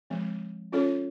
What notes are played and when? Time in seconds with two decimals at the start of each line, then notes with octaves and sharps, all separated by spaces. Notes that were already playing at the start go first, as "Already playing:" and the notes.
0.10 F3 G#3 C4
0.72 C#4 F4 A4 C#5